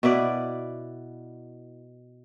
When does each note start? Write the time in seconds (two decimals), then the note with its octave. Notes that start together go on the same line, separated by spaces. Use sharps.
0.03 B2 E4 B4 D5